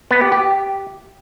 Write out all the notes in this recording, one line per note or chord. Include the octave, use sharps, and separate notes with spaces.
B3
G4
G4